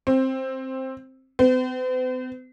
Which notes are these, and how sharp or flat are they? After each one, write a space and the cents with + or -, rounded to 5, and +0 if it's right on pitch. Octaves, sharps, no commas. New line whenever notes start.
C4 +10
C4 -45